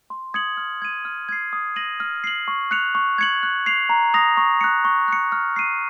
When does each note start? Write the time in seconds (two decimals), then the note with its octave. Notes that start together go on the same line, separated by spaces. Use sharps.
0.10 C6
0.34 D#6 G#6 C#7 F#7
0.57 F6
0.82 G#6 D#7
1.05 F6
1.29 G#6 C7
1.53 D#6
1.76 A#6 D#7 F#7
2.00 F6
2.24 C7 F#7
2.48 C#6
2.71 F#6 C#7 F7
2.95 C#6
3.18 G#6 C#7 F#7
3.43 F#6
3.66 C7 F7
3.89 A#5
4.14 D#6 A#6 F7
4.37 C#6
4.61 F#6 C#7
4.85 C#6
5.08 F#6 C#7
5.32 F6
5.56 C7 D#7